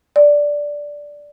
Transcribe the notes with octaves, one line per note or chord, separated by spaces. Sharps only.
D5